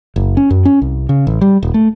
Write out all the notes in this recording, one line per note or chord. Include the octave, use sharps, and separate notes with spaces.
F#1
C#4
F#2
C#4
C2
C#3
A1
G3
D#1
A3